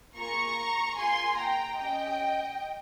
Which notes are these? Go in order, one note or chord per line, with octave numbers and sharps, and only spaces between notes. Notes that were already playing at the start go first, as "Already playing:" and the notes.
A#3 F4 G#4 A#5 C#6
A#3 F4 G#4 G#5 C6
G5 A#5
C#4 G4 D#5 G5